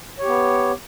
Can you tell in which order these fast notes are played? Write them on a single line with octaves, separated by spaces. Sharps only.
C#5 G4 B3